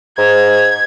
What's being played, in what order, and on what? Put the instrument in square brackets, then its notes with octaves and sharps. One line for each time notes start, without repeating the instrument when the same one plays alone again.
[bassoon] G#2 [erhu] G#6